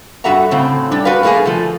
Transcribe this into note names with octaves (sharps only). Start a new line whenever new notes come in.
G2 F#4 A4 E5 F#5 A#5
A2 C#3 C4
G3 D4
F#4 G4 A#4 B4 F5
G3 A3 A#3 F#4 G#4
F3 A3